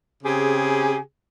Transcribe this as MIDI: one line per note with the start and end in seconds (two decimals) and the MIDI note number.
0.24 0.96 49
0.24 0.96 60
0.24 0.96 67
0.24 0.96 68